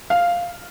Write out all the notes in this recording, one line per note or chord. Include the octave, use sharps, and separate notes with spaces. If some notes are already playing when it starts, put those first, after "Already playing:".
F5